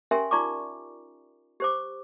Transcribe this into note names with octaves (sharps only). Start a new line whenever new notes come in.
C#4 G4 A#4 E5 G#5 C6
D#4 F4 D5 A#5 C#6 D6
G4 C5 D6